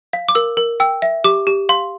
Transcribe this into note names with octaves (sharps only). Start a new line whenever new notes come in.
F5
D6
A#4 E6
A#4
G5 E6
E5
G4 D6
G4
F5 C6